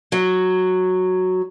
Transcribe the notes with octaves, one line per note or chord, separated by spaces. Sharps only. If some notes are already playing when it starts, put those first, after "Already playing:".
F#3